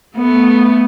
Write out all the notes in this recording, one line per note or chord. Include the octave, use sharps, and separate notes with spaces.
A3 B3